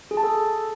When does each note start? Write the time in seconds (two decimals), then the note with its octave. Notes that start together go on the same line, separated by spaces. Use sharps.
0.11 G#4
0.17 A5
0.23 A4